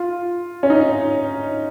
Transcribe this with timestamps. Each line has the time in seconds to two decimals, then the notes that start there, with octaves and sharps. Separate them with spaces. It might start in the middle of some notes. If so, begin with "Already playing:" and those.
Already playing: F4
0.63 C#4
0.70 D#4